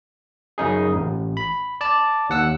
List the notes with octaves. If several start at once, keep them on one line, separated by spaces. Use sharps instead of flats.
F#2 C#3 D#4 G#4
A1
B5
D5 A5
D#2 F#5 E6